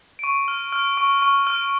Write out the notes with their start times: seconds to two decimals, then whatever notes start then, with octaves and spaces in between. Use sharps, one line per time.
0.19 D7
0.23 C#6 D#7
0.48 F6
0.72 F6
0.97 C#6
1.22 C#6
1.47 F6